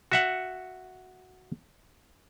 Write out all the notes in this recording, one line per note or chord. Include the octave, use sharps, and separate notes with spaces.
F#4 E5 F#5